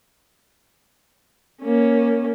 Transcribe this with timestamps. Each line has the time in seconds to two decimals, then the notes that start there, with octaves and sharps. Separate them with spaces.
1.62 A#3 C#4